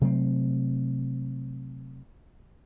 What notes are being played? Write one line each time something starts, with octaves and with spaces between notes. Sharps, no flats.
C3 F#3 A3 C4